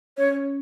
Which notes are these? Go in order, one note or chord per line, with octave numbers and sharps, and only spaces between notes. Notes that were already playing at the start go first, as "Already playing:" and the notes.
C#4 C#5